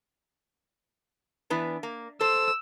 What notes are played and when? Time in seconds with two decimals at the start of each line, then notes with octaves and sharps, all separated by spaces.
1.50 E3 B3 D4
1.83 A#3
2.20 A4 C5 E6